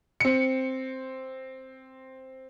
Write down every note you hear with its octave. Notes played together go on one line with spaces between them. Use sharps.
C4 C#7